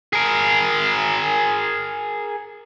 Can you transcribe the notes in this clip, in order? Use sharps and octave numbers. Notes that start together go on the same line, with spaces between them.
G#4 A#4